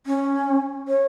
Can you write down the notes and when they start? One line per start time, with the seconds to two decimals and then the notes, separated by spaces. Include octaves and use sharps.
0.06 C#4
0.88 C#5